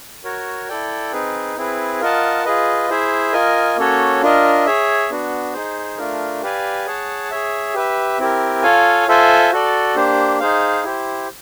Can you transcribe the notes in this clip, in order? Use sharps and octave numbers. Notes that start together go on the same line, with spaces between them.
F#4 A#4 C#5
E4 A4 D5 G5
C4 D#4 G#4 B4
C4 E4 G#4 B4
F4 A#4 D#5 F#5 A5
F4 G#4 B4 D#5
E4 G#4 C5 E5
F4 A#4 D#5 G#5
A#3 C#4 F#4 A4 C#5
D4 F4 A#4 D#5
G#4 C#5 E5
B3 D4 F#4
D#4 G#4 C5
A3 D4 F4 A#4
G4 B4 D5 F5 G#5
G#4 C#5 F#5 A5
G#4 C#5 E5
G4 B4 E5
C4 E4 G4 A#4
F4 A4 C#5 F5 G#5
F4 A4 C5 E5 G#5
F#4 A4 D5
A#3 D4 G4 C5
D#4 G#4 C5 F5
E4 G4 C5